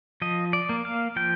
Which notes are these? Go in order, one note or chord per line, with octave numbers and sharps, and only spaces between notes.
F3 D#5
D5
A#3
F5
F3 G5